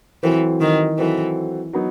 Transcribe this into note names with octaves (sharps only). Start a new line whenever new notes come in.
E3 F#3 C4 F#4 A4 C5
D#3
E3 F#3 C4 F#4 A4 C5
F#3 B3 D#4